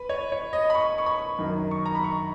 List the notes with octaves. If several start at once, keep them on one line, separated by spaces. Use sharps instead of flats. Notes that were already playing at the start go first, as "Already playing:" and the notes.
Already playing: B4
C#5
C#5
D#5
B5
C#6
C#6
B5
F#2 D#3
C#6
A#5
B5
C#6